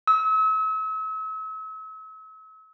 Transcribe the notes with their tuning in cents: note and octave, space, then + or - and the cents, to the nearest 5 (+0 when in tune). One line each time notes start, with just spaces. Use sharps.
E6 -40